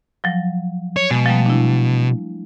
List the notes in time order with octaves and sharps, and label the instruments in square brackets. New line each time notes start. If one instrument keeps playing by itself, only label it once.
[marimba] F3 F#3
[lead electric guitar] C#5
[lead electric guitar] B2 [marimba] G#3
[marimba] F3 G3 A3
D4 E4